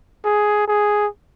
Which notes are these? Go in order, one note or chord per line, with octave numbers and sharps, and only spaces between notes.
G#4
G#4